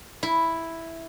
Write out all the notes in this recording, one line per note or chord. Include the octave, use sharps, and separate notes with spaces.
E4